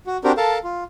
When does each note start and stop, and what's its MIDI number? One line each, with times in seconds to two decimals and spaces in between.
0.07 0.17 66
0.24 0.32 60
0.24 0.32 62
0.24 0.32 66
0.24 0.32 67
0.24 0.32 70
0.37 0.58 69
0.37 0.58 70
0.37 0.58 77
0.37 0.58 81
0.64 0.84 65